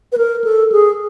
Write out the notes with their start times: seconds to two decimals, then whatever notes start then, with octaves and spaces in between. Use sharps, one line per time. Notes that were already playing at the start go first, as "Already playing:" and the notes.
0.12 B4
0.17 A#4
0.44 A4
0.72 G#4